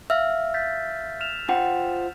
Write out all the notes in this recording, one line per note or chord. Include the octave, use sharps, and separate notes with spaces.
E5 F5 E6 F6
G6 A6 B6
F6 E7 F7
F4 C5 F#5 G5